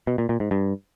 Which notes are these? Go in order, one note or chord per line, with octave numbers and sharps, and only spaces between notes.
B2
A#2
A#2
G#2
G2